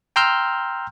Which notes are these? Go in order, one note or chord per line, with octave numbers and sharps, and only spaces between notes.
G5 A#5 C6 E6 F6 G6